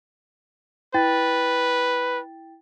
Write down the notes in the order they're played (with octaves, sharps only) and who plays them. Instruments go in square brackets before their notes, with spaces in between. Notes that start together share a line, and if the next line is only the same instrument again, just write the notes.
[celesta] E4 G5 A6 [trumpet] B4